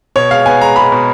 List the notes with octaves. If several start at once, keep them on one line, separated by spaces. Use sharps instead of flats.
B2 C#5
G#3 F5
B3 G#5
G#3 A#5
G#3 B5
B2